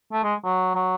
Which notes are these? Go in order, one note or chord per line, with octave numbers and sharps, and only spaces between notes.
A3
G#3
F#3
F#3